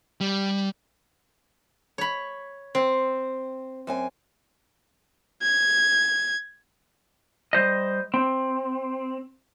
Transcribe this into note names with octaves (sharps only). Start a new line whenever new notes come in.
G3
C#5 B5
C4 C5
F#2 C4 G#5
G#6
G3 C5 D#5
C4